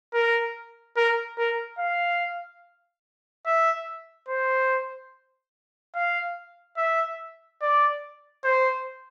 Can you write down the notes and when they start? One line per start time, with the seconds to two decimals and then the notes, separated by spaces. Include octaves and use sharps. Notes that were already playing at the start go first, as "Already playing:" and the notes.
0.13 A#4
0.97 A#4
1.38 A#4
1.79 F5
3.46 E5
4.29 C5
5.95 F5
6.77 E5
7.61 D5
8.44 C5